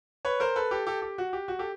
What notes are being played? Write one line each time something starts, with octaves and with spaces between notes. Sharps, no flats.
B4 C#5
A#4 C5
A4 B4
G4 A4
G4 A4
G4
F#4
G4
F#4
G4 A4